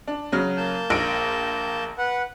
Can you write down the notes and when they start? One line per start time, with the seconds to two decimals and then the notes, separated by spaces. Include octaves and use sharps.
0.07 D4
0.32 C#3 F#3 F6
0.57 A#3 A5 G6
0.90 A#1 D7
1.98 B4 F#5